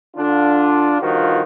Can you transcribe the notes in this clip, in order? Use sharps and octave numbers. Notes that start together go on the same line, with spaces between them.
D3 D4 F4
A1 G2 D#3 F3 F4 F#4